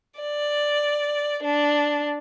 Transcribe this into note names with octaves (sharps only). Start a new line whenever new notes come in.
D5
D4